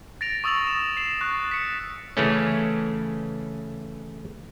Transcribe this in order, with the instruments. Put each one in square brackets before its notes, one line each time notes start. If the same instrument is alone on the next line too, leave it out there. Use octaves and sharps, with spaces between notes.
[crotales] A6 A#6 D7 F7
C#6 D#6 E6 A6 F7 F#7
E7 F7
C7 E7 F#7
C#6 F#6 A6 C7
B6 C#7
[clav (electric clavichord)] C#3 E3 A3 C#4